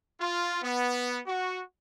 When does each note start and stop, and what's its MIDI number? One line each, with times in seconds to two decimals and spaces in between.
0.20 0.58 65
0.62 1.20 59
1.27 1.61 66